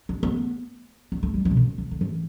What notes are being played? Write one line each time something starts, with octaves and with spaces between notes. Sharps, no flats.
D4
B3
B3
A3
G3
E3
B2
D3
D3
D3
E3